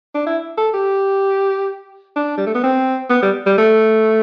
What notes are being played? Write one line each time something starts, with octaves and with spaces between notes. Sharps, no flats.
D4
E4
A4
G4
D4
G3
A3
B3
C4
B3
G3
G3
A3